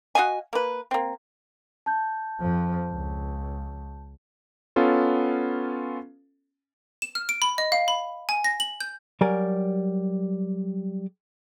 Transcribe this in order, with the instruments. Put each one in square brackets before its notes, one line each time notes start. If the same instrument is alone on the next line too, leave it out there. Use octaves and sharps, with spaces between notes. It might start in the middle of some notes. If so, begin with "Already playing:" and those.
[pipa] F#4 D#5 F5 G#5
A#3 B4
A#3 C4
[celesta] A5 G6
[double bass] F2 F3
C#2
[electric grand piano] B3 C#4 F4 A4
[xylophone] E7
F6
D7
B5
D#5
F5
B5
G#5
A#6
F#7
G6
[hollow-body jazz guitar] F#3 G3 G4 A#4 D5 G#5